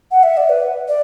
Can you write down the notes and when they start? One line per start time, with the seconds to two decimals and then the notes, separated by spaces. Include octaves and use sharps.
0.11 F#5
0.23 E5
0.37 D5
0.49 B4
0.88 D5